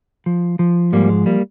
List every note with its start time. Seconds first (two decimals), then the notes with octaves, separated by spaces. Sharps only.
0.26 F3
0.59 F3
0.92 G#2 G3 A#3
1.09 G#3
1.26 G3 A#3